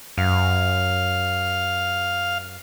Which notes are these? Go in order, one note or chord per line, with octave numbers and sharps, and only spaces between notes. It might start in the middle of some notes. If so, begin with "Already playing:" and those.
F#2 F5